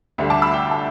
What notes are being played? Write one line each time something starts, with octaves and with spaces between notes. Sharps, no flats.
D2 D3 G3 E5
A5 D6
B5 E6
G5 B5
E5 A5